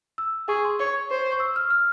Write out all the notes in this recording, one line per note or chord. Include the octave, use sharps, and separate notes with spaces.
E6
G#4 C#6
C6
C#5 C#6
C5
C#6
E6
F6
F6